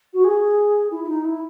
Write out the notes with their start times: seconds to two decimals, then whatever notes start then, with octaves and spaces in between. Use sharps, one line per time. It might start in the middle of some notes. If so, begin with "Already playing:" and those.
0.13 F#4
0.24 G#4
0.91 E4
1.03 E4
1.08 D#4
1.24 E4